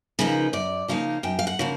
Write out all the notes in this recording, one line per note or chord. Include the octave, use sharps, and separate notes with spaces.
C#3 F3 A#3 D#4 B4
F#2 D5
C#3 F3 A#3 D#4 F5
F#2 G5
F5
F#5
C#3 F3 A#3